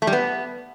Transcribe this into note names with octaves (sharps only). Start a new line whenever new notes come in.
A3
G3
B3